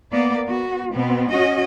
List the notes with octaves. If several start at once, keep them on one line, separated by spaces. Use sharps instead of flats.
A#3 B3 D5
B3 F#4
B2 B3 C4
C#4 F#4 D#5